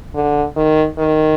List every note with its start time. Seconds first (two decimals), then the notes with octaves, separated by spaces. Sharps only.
0.15 D3
0.56 D#3
0.98 D#3